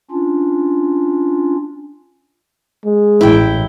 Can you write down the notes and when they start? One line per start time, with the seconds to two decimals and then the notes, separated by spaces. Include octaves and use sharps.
0.11 C#4 D4 F4
2.85 G#3
3.21 A1 E4 G5